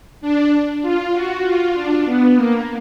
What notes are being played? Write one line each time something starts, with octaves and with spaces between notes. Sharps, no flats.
D4
F4
F#4
F4
D4
B3
A#3